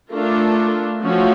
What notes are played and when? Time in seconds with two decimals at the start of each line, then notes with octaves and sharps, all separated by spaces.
0.11 A3 D4 F4 A#4
1.02 F3 A3 C#4 F#4